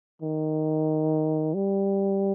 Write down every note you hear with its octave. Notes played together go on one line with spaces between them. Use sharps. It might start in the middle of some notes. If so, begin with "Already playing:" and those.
D#3
G3